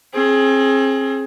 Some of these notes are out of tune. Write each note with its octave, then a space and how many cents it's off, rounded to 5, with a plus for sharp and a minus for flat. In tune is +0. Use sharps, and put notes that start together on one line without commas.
C4 +35 G#4 +15